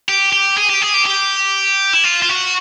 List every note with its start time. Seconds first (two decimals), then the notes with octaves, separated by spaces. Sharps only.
0.09 G4
0.33 G4
0.57 G#4
0.70 G4
0.82 G#4
0.94 G4
1.06 G4
1.93 E4
2.04 F4
2.22 F4
2.29 F#4